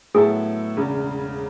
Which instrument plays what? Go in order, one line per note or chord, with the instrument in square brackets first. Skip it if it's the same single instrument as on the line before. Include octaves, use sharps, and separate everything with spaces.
[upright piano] A2 F#3 B3 E4 A4 [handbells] G#4
[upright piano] E1 E2 C#3